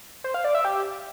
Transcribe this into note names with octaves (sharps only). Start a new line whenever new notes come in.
C5
F5
D5
E5
G4